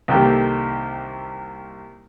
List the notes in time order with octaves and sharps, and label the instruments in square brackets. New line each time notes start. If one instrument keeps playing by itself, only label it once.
[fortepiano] C2 D#3 A#3 G4 A4